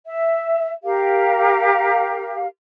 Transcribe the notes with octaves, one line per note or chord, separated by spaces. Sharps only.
E5
G4 A#4 F5